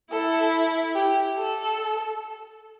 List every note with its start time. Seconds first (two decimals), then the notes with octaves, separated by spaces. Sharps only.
0.12 E4 A4
0.96 G4
1.38 A4